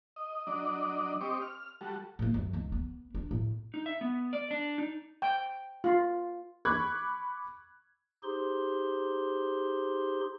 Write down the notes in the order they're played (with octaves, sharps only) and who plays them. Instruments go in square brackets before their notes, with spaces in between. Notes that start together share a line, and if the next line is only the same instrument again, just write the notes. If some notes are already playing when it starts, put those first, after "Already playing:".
[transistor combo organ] D#5
F#3 D4 D5 D#5
C4 G4 D#5 C#6 D6
F6
G3 F#4 A4
[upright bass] A2 A#3
F#2
C#2 D#3
B3
D4
A2
[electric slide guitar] D#4
E5
B3
D5
D4
D#4
[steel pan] G5
F4
[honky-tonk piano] B5 C#6 D6 F#6 G#6
[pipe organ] D#4 G4 G#4 C5 C6